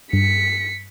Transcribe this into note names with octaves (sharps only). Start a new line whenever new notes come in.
G2 B6 C#7